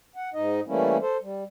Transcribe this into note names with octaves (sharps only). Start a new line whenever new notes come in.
F#5
G#2 D#4 D#5
E3 G3 A3 A#3 C#4 E4
A4 C5
G3